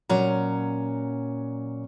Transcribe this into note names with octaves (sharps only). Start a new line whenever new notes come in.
A#2 F#3 C#4 A#5